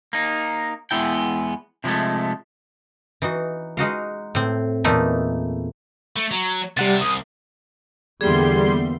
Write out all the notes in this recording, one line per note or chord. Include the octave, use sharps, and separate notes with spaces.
A#3 D#4
E2 G#2 G#3 B3 E4 G5
C3 F3 F#3 G#3 A3
E3 D#4 F#4
G#3 D#4 F#4 F5
A2 C4
E2 A#2 A3 D#4 E4 E5
A3
F#3
C3 G3 F#5 A6
C2 D#6
E2 D3 G3 A#3 B3 G#4 E5 C6